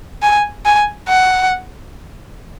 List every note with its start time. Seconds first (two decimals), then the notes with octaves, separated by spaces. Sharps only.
0.22 G#5
0.66 G#5
1.08 F#5